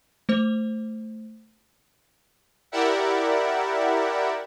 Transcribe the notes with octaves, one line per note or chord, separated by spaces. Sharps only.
A3 C5
E4 G4 A#4 D5 E5 F#5